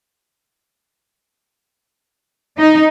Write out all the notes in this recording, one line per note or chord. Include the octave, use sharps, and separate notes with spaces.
D#4